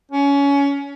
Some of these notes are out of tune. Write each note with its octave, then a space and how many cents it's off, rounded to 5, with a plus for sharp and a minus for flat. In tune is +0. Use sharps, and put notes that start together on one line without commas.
C#4 +25